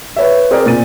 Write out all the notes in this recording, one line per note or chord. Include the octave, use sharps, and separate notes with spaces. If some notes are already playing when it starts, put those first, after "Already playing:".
B4 C#5 E5
C4 G#4 A#4 D5
A#2 A6 D#7